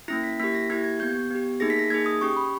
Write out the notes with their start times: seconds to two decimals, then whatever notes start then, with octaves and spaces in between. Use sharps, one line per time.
0.08 A#3 C#4 E4 A#6
0.24 B6
0.40 A#3 E4 G4 B6
0.55 A#6
0.69 A#3 E4 G4 G#6
0.84 G#6
0.99 B3 G4 G6
1.30 B3 G4
1.60 A#3 D#4 G#4 A#6
1.70 B6
1.79 A#6
1.90 A#3 D#4 G#4 G#6
2.06 D#6
2.21 C#4 G4 C#6
2.37 B5